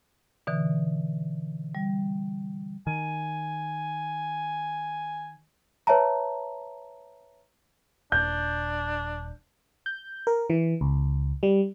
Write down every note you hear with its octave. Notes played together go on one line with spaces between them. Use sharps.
B2 D3 E3
G3
D#3 G#5
B4 C#5 E5 A5 A#5
D#1 D4 G6
G6
A#4
E3
C#2
G3